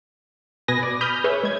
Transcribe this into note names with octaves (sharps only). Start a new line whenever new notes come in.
B2 B4 D#5 G#5 A#6
D5
B5 D#6 F6 G6
G#4 B4 C#5 E5
G#3 G#6